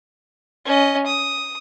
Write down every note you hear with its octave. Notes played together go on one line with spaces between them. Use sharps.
C#4 D#5
D#6